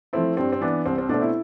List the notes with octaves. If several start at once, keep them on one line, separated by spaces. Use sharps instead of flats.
F3 A3 C4 E4
G2 C4
C4
E3 B3 D4
C2 C4
C4
B2 A3 C4 D4
E4